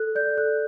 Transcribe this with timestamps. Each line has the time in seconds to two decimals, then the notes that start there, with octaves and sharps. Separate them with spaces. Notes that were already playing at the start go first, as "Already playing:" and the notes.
Already playing: A4 F#6
0.15 D5 G6
0.38 A4 F#6